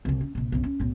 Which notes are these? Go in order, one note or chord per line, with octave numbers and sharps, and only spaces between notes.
C2 C3
C#4
A#1 C3
B1 F#2
C#4
B1 A2